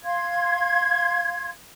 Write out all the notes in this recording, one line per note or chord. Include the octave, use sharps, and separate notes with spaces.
F5 C6 G#6